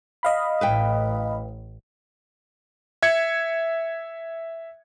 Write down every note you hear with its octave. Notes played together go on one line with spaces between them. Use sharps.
D#5 F5 B5
A1 A2 B4 E5 G5
E5 G#6 C#7